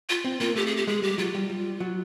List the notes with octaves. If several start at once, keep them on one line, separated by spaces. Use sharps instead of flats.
F4
C4
A#3 F4
A3 G4
G#4
G4
G#3 G#4
G3 G4
F#3 F4
G3
G3
F#3